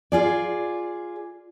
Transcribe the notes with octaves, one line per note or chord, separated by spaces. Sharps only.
F4 G#4 D5